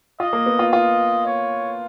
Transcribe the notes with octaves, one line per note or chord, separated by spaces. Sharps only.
F4 D#5
A#3
B3
F4
F4 D#5
C#5